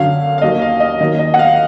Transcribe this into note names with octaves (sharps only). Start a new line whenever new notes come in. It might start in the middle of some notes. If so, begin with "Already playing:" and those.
Already playing: F#2 D3 F#3 F5
F5
D#2 D#3 F#3 D#5
F5
D#5
D#2 D#3 F#3 D#5
D#5
F#5
F5